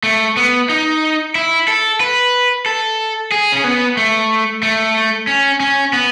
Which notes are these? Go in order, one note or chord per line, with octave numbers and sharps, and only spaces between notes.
A3
B3
D#4
E4
A4
B4
A4
G#4
C#4
B3
A3
A3
C#4
C#4
B3